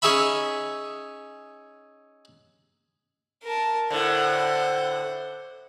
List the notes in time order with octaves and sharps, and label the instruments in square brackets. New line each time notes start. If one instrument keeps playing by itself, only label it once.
[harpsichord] C#4 D#4 G#4 C#5 E5 B5
[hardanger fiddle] A#4 A5
[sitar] A2 D3 [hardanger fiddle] C5 F#5